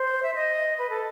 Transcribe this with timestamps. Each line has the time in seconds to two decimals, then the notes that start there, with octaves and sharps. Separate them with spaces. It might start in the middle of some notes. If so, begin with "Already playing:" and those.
Already playing: C5
0.23 E5
0.35 D#5
0.78 B4
0.90 A4